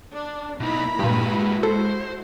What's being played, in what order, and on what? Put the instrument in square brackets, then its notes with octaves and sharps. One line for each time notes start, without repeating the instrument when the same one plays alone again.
[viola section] D4
[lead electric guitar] B2 D#4 [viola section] A#3 B5 [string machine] E4 A#5
[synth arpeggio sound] G2 A#2 [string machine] G#3 E4 F#4 [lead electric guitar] G4 B4
[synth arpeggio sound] A4 [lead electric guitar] C5